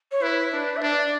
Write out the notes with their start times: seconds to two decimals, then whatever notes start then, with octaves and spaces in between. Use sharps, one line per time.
0.11 C#5
0.21 E4 B4
0.52 D4 B4
0.76 E5
0.82 D4 D5